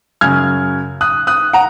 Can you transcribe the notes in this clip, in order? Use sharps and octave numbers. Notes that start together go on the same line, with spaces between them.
F#2 C#3 F6 G#6
D#6 F#6
D#6 F#6
F#5 A#5